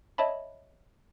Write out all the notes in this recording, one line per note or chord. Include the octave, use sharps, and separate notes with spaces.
C#5 D#5 E5 A5 B5